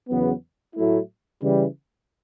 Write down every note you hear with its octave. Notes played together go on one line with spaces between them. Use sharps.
E2 C#3 F#3 B3
A2 F#3 A3 E4
C#3 E3 G3